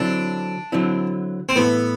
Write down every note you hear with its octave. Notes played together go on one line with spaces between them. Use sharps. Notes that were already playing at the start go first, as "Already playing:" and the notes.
Already playing: D3 F#3 C4 D4 E4
D3 F#3 C4 E4
C4
A2 E3 A3 B3